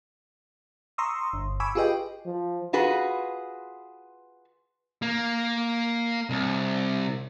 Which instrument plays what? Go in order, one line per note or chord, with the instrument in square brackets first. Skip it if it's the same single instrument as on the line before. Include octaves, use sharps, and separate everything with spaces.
[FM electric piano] A#5 C6 C#6 D#6 E6
G1
G#5 B5 C#6 D6 E6
F4 G4 G#4 B4 D#5 G5
[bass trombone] F3
[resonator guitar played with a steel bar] F4 F#4 G#4 B4
[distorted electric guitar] A#3
C2